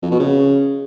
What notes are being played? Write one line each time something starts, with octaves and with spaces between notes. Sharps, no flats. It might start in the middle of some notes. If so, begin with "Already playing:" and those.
F2
B2
C#3